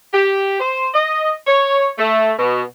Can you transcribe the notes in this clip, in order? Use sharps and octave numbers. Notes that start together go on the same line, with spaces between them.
G4
C5
D#5
C#5
A3
B2